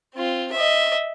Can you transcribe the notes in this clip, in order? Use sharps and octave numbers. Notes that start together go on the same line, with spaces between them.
C4 F4
D#5 E5